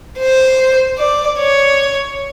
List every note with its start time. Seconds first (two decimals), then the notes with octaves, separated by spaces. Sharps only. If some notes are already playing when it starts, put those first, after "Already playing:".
0.19 C5
0.99 D5
1.40 C#5